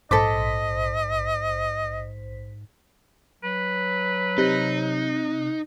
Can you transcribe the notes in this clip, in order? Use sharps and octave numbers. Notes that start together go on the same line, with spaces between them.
A#1 G#2 A4 C5 D#5 D6 B6
F#3 B4
C3 D#4 F#6